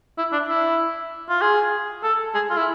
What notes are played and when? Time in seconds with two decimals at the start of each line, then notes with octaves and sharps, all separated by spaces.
0.18 E4
0.32 D4
0.48 E4
1.29 F4
1.41 G#4
2.03 A4
2.35 G#4
2.50 F4
2.57 E4